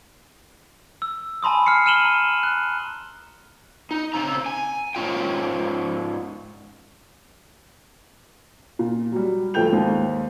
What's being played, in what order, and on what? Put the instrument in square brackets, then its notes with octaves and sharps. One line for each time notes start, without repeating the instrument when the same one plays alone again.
[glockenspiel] E6
G#5 A5 B5 C6 D#6
F6 C7 C#7
F6 D#7 E7 F#7 G7
A#5
F#6
[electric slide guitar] D#4
C#3 C4 A#5
G#5
G#2 C#4 F4 G5
[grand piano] A#2
F#3 G3
D1 F3 A3 G5 G6 F7
D#2 G#2